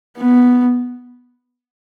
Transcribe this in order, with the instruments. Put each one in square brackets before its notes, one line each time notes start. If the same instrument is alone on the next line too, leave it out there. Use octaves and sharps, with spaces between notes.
[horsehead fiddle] B3